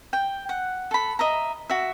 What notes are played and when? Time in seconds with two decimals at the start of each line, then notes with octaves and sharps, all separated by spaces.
0.13 G5
0.49 F#5
0.91 A4 B5
1.19 D#5 E5 A#5
1.70 F#4 E5